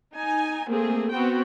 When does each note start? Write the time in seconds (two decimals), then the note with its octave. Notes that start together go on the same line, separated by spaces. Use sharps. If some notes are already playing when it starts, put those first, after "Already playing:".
0.14 D#4 G#5
0.67 A3 A#3 C4 G#4
1.11 B3 C4 F#4 G5